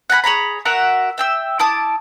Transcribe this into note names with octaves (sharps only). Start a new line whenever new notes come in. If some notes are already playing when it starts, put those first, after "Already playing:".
F#5 G#5 A#5 B5
G#4 C#5 A#5 B5
F#4 A#4 E5 F#5
E5 G5 E6
E4 A5 D6 D#6